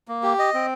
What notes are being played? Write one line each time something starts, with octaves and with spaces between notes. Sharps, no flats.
A#3
G4
D#5
C4